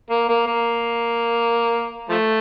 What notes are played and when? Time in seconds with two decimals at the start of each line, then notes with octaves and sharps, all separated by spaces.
0.11 A#3
0.29 A#3
0.46 A#3
2.09 F3 A3